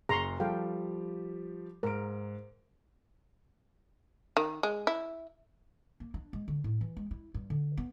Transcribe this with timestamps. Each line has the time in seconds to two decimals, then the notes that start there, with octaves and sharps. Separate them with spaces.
0.09 F#1 A#5 C6 C#6
0.40 F3 G3 G4 A4 F5 G5
1.83 G#2 A#4 D7
4.37 D#3
4.63 G#3
4.87 E4
6.00 A#3
6.14 D4
6.33 G#3
6.48 D3
6.64 A2
6.81 E3
6.97 G#3
7.11 E4
7.34 G2
7.50 D3
7.77 B3